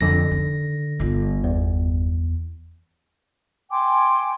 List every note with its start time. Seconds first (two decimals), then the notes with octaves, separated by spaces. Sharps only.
0.01 F2 D3 A#6
0.31 D#3
0.99 G1 F4
1.44 E2
3.70 G5 G#5 C6 D6